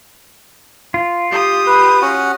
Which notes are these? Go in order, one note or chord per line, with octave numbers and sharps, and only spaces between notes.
F4
G4 D#6
B4
C#4 F#4 F#5